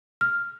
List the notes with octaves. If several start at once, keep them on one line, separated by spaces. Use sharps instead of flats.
F6